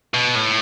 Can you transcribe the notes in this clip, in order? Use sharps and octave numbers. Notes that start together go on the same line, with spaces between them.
B2
A2